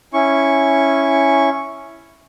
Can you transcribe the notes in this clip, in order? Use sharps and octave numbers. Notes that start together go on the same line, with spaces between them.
C#4 E4 C#6